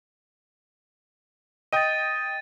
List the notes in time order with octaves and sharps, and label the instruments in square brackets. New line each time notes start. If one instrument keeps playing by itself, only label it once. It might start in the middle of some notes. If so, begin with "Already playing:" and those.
[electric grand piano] D#5 G5 D#6 [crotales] A6 D#7